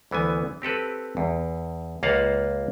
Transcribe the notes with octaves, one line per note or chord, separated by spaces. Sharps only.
D2 E3 B3 G#5
C4 G4 A4 B4
E2
C#2 A#3 F4 C5 F5 F#5